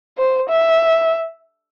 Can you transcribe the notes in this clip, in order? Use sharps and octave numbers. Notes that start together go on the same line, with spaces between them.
C5
E5